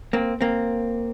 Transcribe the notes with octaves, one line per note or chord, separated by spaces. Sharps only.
A#3 C4
A#3 C4